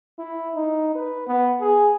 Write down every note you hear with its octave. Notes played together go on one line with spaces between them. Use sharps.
E4
D#4
B4
B3
G#4